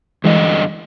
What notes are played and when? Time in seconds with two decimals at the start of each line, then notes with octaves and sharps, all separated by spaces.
0.24 G2 D3 E3 G#3 D#5